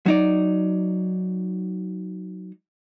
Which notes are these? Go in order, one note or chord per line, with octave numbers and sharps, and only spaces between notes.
F#3 D#4 D5